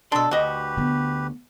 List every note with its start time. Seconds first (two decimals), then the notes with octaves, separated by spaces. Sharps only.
0.12 B2 D4 A4 C6
0.31 D2 F#4 G4 B4 D#5
0.77 D3 B3